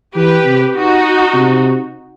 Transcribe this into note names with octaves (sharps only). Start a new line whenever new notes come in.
E3 G4 B4
C3
D#4 F#4
C3